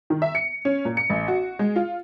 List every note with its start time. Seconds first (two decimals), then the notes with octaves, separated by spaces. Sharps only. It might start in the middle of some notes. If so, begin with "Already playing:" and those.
0.10 D#3
0.22 E5
0.35 C#7
0.65 C#4
0.85 A#2
0.97 C#7
1.10 A1
1.28 F#4
1.59 G#3
1.76 F4